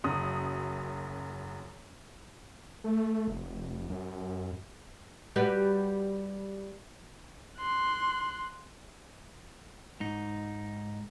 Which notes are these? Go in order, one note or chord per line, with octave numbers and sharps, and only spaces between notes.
F#1 F#2 D#6
A3
F1
F#2
G3 F#4 B4
C6 F#6
G#2 D#4